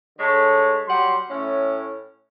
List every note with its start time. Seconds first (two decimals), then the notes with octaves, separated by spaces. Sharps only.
0.19 D3 G#3 A3 C#5 A5
0.87 F#3 G3 F#5 C6
1.30 A2 C#4